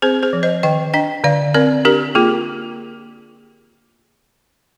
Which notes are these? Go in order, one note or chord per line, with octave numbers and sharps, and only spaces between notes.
C4 G#4 C5
G#4 C5
F3
C5 D#5
D#3 D#5 G5
D4 D#5 G5
D3 D5 F5
C4 A#4 D5
D4 G4 A#4
A#3 F4 G#4